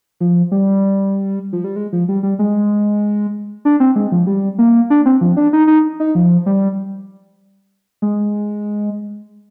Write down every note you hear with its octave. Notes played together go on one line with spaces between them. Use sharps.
F3
G3
F3
G3
G#3
F3
G3
G3
G#3
D4
C4
G#3
F3
G3
A#3
D4
C4
F3
D4
D#4
D#4
D#4
F3
G3
G#3